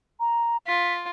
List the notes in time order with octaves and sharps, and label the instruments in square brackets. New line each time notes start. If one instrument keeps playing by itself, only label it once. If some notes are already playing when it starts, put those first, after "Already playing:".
[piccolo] A#5
[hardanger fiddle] F4 [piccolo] B6